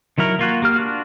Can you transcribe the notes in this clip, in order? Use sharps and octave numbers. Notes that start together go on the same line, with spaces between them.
D#3 F#3 E4 A#4
A#3 F4 F#4
A#3 G4 F6
D4 F4 F#4